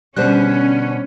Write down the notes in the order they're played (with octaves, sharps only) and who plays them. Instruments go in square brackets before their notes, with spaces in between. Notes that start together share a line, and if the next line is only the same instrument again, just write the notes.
[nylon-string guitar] B2 D3 G3 [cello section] C#4 [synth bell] C5 F#6